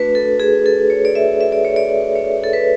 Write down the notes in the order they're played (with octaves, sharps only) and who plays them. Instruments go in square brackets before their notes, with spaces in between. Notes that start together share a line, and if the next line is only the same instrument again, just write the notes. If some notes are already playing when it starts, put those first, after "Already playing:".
Already playing: [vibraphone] A3 D4 F#4 B4
A4
G#4
A4
C#5
D5
E5
E5
D5
C#5
D5
C#5
A4
B4